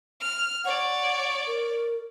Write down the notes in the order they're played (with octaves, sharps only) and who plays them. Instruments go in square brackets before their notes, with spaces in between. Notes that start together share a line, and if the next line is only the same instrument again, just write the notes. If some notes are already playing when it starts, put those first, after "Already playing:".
[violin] F6
[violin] C#5 D5 [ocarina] F#5
[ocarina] A#4